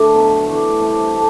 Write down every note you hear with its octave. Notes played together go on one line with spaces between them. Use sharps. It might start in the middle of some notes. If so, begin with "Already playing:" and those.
Already playing: D3 A3 D4
B2 F#3 B3
E3 A3 D4
C3 G3 D4
A3 D4 G4